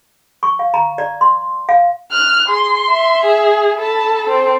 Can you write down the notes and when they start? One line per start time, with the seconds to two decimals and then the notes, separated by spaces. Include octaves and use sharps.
0.43 C#6
0.59 F5
0.74 A#5
0.98 D5
1.21 C6
1.69 F5
2.12 F6 F#6
2.49 G#4 C6
2.90 E5
3.23 G#4
3.79 A4 A5 B5
4.28 C4